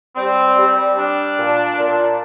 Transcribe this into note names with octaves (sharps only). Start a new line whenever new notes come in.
G3 C4
G3
G3 D4
A#2
A#2